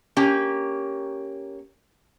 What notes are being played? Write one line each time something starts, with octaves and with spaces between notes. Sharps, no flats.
A#3 C#4 G4